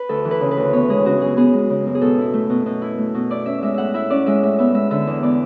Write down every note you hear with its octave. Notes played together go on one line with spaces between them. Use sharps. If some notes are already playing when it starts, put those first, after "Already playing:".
Already playing: B4
D2 A4
E3
B4
C#3
B4
D2
B3 C#5
G#3 G#4
C#3 F#4
F#2 G#4
B3 G#4
G#3
C#3
F#2
G#4
B2 A4
E4
A3
B2
B2
E4
A3
B2
E4 D5
C#4 E5
G#3 E5
A2 E5 F#5
E4 E5
C#4 D5
G#3 E5
A2 E5
B3 E5
G#3 E5
D3 E5
E2
B3 D5